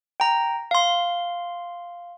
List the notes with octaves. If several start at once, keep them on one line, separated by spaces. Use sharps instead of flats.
G5 A#5
F5 C6